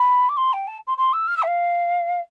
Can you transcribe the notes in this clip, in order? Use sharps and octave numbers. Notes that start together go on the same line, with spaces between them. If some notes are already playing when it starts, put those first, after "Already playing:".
Already playing: B5
D6
C6
G5
A5
C6
C6
E6
F6
E6
E5
F5